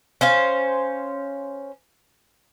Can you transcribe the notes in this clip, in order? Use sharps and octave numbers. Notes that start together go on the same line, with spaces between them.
C#4 C5 F5